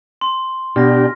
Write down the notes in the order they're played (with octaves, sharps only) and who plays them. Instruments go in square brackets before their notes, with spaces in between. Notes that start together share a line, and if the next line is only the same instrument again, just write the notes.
[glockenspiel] C6
[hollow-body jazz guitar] B2 [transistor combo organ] D4 G4 [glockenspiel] F6 A#6